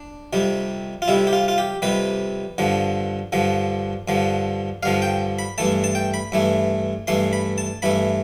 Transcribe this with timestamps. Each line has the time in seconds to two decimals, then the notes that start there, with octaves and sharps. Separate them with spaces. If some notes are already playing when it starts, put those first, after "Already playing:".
Already playing: D4
0.33 F2 C3 G3
1.02 F4
1.08 F2 C3 G3 E4
1.27 G4
1.33 F4
1.48 F4
1.58 G4
1.82 F2 C3 G3 B4
2.58 G2 D3 F3
3.32 G2 D3 F3
4.08 G2 D3 F3
4.83 G2 D3 F3 F5
5.02 G5
5.39 B5
5.58 G2 E3 A3 A5
5.84 A5
5.95 G5
6.14 B5
6.32 G2 E3 A3
7.07 G2 E3 A3 C6
7.33 B5
7.58 A5
7.82 G2 E3 A3 B5